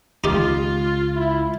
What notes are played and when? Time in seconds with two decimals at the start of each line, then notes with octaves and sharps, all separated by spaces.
0.24 C#2 D#4 F4 G4
1.16 E4